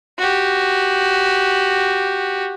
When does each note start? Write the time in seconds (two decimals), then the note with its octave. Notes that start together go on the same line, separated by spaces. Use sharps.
0.18 F#4 G4